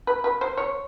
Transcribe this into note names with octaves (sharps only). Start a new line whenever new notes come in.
B4
B4
C5
C#5